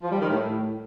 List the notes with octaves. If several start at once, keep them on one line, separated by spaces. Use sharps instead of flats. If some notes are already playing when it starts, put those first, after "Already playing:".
F3
G3
D#3
A2